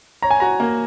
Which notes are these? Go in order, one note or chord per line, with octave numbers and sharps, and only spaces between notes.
C#5 A#5
G#5
F#4 A#5
A#3